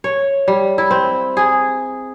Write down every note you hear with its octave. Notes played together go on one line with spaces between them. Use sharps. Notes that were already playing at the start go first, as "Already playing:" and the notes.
C#5
G3
E4
C4
G#4